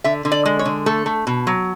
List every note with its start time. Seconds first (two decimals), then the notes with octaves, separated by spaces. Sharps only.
0.04 D3 E5
0.25 D3
0.32 D5
0.46 G#3
0.59 C#5
0.66 D3
0.86 A3 A4
1.06 A3
1.27 B2
1.47 F#3